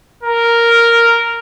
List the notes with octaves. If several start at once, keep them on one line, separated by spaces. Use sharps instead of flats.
A#4